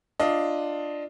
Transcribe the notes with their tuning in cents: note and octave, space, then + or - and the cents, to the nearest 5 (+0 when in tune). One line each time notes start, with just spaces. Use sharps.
D4 +10 F4 +0 D#5 +15